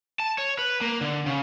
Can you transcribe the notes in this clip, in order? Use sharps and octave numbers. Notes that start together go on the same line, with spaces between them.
A5
C#5
B4
A#3
D3
C#3